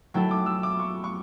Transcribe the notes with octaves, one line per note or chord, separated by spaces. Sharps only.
F#3 A3 E4 A4 G5
D6
E6
D6
C#6
C#6